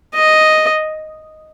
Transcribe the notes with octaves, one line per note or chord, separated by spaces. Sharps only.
D#5